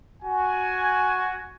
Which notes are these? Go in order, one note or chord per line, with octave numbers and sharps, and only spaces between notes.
F#4 G#5